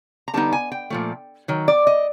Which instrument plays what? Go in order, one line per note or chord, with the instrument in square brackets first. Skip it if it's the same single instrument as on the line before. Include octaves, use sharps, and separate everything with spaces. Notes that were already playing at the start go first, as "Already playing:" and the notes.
[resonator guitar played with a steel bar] A#5
D3 G3 B3 D#4 A5
G#5
G5
A#2 F3 A3
D#3 F#3
D5
D#5